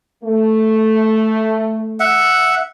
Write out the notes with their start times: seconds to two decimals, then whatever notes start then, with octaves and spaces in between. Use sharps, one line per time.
0.24 A3
2.00 E5 F#5